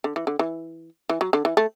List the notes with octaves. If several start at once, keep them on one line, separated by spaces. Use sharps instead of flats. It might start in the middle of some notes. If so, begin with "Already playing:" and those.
D3
E3
D3
E3
E3
F#3
D3
E3
A3